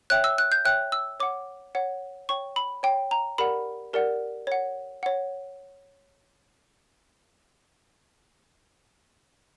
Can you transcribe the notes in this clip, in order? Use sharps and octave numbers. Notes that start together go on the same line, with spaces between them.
C#5 E5 G5 F#6
E6
F#6
G6
C#5 E5 G5 F#6
E6
C#5 F#5 D6
C#5 F#5
C#5 G5 C#6
B5
C#5 G5
A#5
G4 A#4 D5 F#5 B5
G4 A#4 D5 F#5
C#5 F#5
C#5 F#5